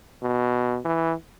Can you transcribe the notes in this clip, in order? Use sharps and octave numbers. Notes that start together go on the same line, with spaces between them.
B2
E3